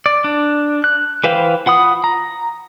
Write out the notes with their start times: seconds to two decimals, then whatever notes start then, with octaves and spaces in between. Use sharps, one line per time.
0.06 D5
0.24 D4
0.84 F#6
1.24 E3 B4 C5 F5 G5
1.66 F4 F#5 B5 D#6
2.04 A#5